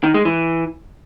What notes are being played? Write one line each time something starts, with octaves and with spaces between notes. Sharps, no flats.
D#3
G#3
E3